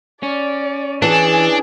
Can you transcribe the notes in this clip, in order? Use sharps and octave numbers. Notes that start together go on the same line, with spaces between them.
C#4 D5
E3 D4 G#4